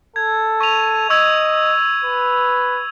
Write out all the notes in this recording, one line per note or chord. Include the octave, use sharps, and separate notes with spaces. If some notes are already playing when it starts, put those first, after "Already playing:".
A4 G#6
C#6 D#7 F7
D#5 C#6 E6 G#6
B4